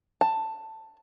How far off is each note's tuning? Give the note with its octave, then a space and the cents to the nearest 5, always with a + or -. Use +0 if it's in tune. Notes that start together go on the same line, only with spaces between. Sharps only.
A5 +10